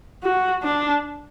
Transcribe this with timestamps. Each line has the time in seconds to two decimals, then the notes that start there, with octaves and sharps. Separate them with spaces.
0.24 F#4
0.63 D4